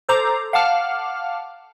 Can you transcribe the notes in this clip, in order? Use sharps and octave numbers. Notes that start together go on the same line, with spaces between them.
A4 C5 A#5 D6
F5 F#5 A5 D6 F6